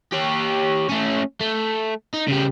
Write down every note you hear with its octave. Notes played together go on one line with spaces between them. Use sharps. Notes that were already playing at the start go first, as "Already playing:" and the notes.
G4 C#5
A3 C#4
A3
D#4
C#3 G3